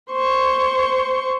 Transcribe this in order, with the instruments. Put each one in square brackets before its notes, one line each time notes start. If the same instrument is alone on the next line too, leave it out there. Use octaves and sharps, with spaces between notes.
[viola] C5 C#6